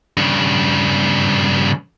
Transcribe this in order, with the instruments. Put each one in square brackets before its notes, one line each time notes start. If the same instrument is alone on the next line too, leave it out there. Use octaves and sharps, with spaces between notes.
[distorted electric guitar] G2 C#3